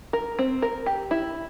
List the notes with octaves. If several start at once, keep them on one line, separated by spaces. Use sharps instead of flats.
A#4
C4
A#4
G4
E4